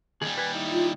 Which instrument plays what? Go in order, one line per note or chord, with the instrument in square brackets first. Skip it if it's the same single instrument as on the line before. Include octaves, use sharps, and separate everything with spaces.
[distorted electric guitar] D#2 G3 [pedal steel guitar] G#4
[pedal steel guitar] B4 G#5
D#4 E4
[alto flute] F4